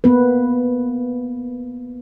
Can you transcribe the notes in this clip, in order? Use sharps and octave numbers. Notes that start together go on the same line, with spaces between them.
A#3 B3 B4